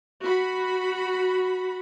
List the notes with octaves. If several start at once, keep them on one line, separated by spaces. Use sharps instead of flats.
F#4 B5